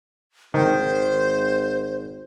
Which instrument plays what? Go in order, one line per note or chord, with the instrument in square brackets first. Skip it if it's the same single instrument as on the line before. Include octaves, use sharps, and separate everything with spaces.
[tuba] G#1 [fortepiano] D#3 [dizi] C5